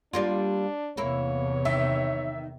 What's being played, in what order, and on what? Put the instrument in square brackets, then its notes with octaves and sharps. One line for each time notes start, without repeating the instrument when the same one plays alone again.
[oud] G3 A#3 F4 [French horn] D4
[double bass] E2 C3 [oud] A#3 E4 [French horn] C#5
[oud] D#3 [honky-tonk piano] E5